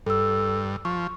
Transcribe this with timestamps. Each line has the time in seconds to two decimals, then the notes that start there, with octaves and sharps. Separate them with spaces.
0.06 G2 A4 E6
0.85 F3 C#6